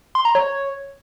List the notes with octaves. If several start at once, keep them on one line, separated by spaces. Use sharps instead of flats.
C6
A#5
C#5